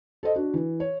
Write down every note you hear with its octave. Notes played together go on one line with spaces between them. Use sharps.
A4 C5 D#5
D4 F#4
E3
C#5